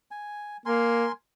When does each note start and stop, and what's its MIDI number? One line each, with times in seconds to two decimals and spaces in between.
0.11 0.57 80
0.66 1.06 58
0.66 1.12 70
0.66 1.12 80
0.66 1.12 84